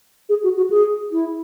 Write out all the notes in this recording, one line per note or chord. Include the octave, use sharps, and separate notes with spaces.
G#4
F#4
F#4
G#4
E4